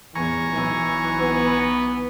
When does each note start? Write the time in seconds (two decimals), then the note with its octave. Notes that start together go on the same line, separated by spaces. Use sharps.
0.15 E2 G#5 A#5 C#6
0.49 B1 E3
1.20 B3